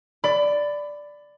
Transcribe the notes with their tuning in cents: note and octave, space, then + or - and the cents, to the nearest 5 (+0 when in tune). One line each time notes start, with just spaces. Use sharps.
D5 +0 B5 +25